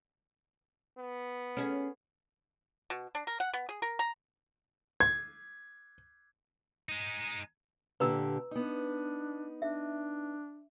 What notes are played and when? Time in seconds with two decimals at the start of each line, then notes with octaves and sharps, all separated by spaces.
0.99 B3
1.57 C#4 G#4
2.90 B2
3.15 D4
3.27 A#4
3.40 F#5
3.53 B3
3.69 G#4
3.82 A#4
3.99 A#5
5.00 G#6
6.89 G#3 D#4
8.00 A#2 D3 G4 B4 A#5 E6
8.51 B3 D4 D#4
9.62 D4 E5